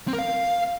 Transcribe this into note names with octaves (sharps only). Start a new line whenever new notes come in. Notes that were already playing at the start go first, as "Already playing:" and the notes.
C4
A#4
F5